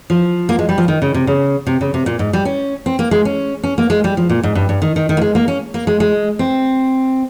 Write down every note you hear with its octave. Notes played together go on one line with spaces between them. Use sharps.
F3
A#3
G#3
G3
F3
D#3
C#3
C3
C#3
C3
C#3
C3
A#2
G#2
G3
C#4
C4
A#3
G#3
C#4
C#4
A#3
G#3
G3
F3
A#2
G#2
G2
G2
D#3
D#3
D#3
A#3
G#3
A#3
C#4
A#3
G#3
G#3
C4